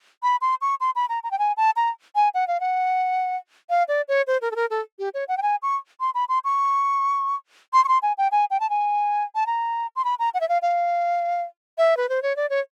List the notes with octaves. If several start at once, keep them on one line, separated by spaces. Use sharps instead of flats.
B5
C6
C#6
C6
B5
A#5
A#5
G5
G#5
A5
A#5
G#5
F#5
F5
F#5
F5
D5
C#5
C5
A#4
A4
A#4
A4
G4
C#5
F#5
G5
G#5
C#6
C6
B5
C6
C#6
C6
C#6
C6
G#5
G5
G#5
G5
A5
G#5
A5
A#5
C6
B5
A#5
F#5
E5
F5
F5
E5
B4
C5
C#5
D5
C#5